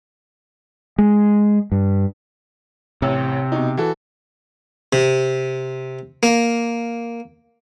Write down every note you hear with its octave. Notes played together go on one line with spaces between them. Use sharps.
G#3
G2
A1 C3
B2 D#4
E3 F#4 A4
C3
A#3